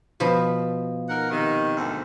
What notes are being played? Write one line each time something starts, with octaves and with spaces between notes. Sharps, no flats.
B2 F3 B5
D#4 A#4 F#5
C3 D#3
D2 G#2